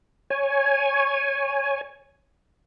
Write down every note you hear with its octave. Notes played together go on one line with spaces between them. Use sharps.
C#5 G#5